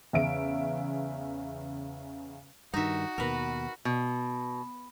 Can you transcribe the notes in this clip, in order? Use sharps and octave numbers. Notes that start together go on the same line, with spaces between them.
E2 C#3 E5 F5 D7
G2 D#3 D#4 F#4 E5
D#2 B2 A#4 B4
B2